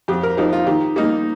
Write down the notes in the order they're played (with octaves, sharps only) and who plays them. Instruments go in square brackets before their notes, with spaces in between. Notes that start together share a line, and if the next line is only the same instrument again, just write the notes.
[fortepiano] F2 G4
A#4
F3 D#4 G4
F4
D#3 G4
G3 A#3 D#4